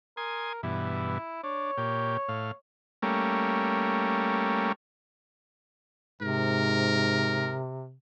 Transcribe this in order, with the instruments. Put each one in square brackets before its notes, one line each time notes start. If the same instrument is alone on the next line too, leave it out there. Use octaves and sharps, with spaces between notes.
[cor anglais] A#4 [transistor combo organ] G#5 C6 D#6
[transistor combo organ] G2 B2 E3 [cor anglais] E4
[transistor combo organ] D4 [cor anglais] C#5
[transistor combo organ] A#2 G4
A2 F5
G3 A3 A#3 C#4
[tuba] G#2 [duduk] C3 [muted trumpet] A#4